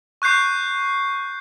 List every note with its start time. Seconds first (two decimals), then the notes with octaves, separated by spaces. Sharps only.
0.22 C#6 F#6 G6 C7